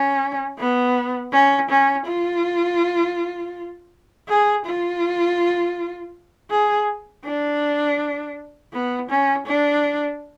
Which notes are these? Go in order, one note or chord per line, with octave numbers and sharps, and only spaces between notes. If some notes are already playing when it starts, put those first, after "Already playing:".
Already playing: C#4
B3
C#4
C#4
F4
G#4
F4
G#4
D4
B3
C#4
D4